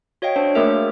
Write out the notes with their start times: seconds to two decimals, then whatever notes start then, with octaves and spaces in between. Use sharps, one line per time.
0.22 F#4 C#5 D#5 F5 G5
0.36 D4 C5 C#5
0.55 A3 A#3 F#4 G#4 A#4 E5